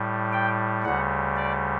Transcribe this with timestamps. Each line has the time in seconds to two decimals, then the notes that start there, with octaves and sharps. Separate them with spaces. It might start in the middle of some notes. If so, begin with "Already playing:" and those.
Already playing: A2 G3
0.33 G5
0.84 D2 C#3 G3 F#5
1.36 D5